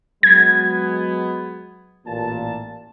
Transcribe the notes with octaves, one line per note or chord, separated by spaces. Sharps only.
F#3 G#3 B3 G#6
A1 A#2 A5